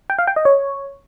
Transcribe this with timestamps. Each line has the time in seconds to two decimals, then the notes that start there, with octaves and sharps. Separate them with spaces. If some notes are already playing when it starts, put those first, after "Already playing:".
0.10 G5
0.19 F5
0.27 G5
0.36 D#5
0.45 C#5